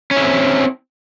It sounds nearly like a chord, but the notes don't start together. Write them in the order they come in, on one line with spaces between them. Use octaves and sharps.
C#4 E4 C4